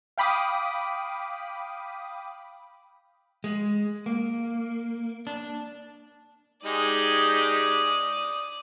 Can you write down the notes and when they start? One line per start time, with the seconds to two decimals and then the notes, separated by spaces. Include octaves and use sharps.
0.18 F5 G5 B5 D6 D#6
3.44 G#3
4.06 A#3
5.27 D4
6.65 G#3 D#4 G4 D5 D#6